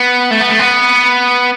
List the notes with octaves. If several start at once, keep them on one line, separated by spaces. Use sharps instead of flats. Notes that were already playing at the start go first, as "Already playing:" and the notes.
Already playing: B3
A3
B3
A3
B3